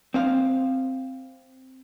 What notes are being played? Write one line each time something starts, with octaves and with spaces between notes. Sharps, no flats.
C4 C5 F5